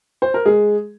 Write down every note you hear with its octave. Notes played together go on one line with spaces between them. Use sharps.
C5
A#4
G#3 G#4